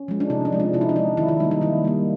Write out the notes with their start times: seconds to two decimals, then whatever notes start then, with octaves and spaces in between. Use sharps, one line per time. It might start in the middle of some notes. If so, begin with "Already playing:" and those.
Already playing: C#4
0.08 F3 G#3
0.20 D4
0.30 C3 D#4
0.45 D4
0.52 F3 G#3
0.60 D4
0.73 C3 E4
0.81 D#4
0.89 D4
0.96 F3 G#3 D#4
1.17 D#3 E4
1.28 E4
1.40 G3 A#3 D#4
1.51 D#4
1.61 D#3 E4
1.84 G3 A#3